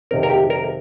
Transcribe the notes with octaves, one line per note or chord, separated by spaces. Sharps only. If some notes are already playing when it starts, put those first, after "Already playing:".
F2 C3 D#3 C4 A#4
A#4
G4
A#4